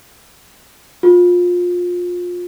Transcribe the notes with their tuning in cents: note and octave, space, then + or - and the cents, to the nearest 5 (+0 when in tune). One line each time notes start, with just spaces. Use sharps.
F4 +25